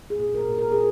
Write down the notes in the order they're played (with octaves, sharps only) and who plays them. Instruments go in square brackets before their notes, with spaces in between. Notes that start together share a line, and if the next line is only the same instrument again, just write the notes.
[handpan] G#4
A#2
A#4
A#2
A#4
G#4